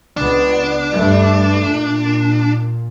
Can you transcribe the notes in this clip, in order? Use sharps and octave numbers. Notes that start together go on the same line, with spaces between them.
C#2 B3 D4
G2 A3
A#2